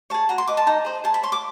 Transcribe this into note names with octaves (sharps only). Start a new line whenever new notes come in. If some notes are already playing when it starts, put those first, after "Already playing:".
G#4 C#5 A5
F#4 A#5
C6
B4 D#5 D6
A5
D#4 A#5
G#4 C5 D#5
G#4 A5
B5
C#5 C6
D6